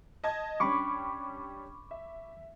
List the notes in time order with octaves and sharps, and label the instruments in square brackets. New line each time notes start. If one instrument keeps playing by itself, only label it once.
[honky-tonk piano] D#5 A5 G#6
[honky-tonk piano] G3 C#4 D4 [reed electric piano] B5 C#6 D6
[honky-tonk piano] E5